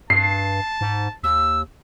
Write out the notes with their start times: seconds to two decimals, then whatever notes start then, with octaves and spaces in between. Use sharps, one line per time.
0.10 G2 A5 C7
0.81 G#2
1.23 D#2 E6